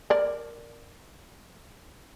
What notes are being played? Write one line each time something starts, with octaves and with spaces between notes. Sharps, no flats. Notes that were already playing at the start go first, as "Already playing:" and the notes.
A#4 D5